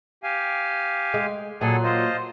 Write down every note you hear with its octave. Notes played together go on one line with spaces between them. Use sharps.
G4 F5 G#5
G#3
A#2 F#3 G#4 A4 G#5
F4 C5 D#5